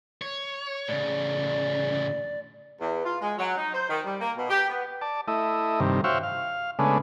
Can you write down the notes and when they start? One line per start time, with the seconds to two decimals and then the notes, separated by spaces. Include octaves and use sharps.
0.22 C#5
0.88 A2 C#3 D5
2.81 E2
3.05 F4
3.22 G#3
3.38 F#3
3.57 D#4
3.73 C5
3.89 D#3
4.06 G3
4.21 A#3
4.37 B2
4.50 G4
4.70 B3
5.02 D5 A5
5.28 A3 E4 D#5
5.80 G2 C3 D#3
6.04 F#4 C5 C#5 E5 F5 G5
6.23 F5
6.79 C#3 G#3 A3 B3 D4